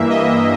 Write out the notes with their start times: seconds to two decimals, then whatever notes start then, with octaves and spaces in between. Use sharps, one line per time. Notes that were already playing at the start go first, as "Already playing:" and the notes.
Already playing: G2 E3 A#3 E5
0.10 D#5